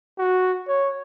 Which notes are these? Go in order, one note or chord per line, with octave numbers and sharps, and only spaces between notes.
F#4
C#5